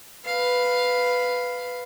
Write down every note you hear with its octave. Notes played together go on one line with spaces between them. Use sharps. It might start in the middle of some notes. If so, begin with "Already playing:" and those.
B4 F5